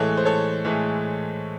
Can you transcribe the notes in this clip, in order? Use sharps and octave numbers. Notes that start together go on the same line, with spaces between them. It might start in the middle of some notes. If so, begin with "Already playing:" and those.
Already playing: A2 E3 G#3 A4 C#5
C5
A4 C#5
A2 E3 G#3